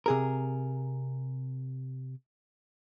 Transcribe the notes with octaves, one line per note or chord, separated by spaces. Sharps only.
C3 G#4 A#4